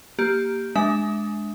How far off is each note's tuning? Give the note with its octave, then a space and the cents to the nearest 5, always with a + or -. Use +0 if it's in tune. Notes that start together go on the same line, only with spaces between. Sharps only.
A#3 +0 G4 +0
G#3 +15 D4 +0 E5 +0